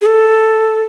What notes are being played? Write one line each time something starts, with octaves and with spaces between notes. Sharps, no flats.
G#4
A4